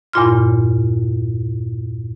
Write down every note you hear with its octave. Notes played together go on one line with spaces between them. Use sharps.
E2 G2 A#2 F4 C6 F6